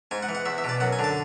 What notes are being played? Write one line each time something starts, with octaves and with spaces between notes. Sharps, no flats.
G#2 G#5
F#5
E3
F#5
E2 E5
E5
B2 D5
F#2 F#5
G#5
D3
A5